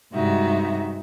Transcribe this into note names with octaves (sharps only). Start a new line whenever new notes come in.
G2 C3 G#3 D#4 F#4 E5